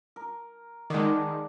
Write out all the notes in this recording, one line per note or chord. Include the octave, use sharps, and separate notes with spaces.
A#4
D#3 G#3 D5 F#5 A5